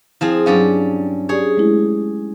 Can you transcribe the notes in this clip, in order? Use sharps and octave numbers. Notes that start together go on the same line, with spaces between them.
F3 C4 E4 G#4
G2 F#3 C#4 D5 F5
G4 G#4 C#5 D5
G#3 A3 E4